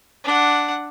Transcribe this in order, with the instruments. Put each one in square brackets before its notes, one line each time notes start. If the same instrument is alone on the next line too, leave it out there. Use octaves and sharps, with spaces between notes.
[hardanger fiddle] D4 F#5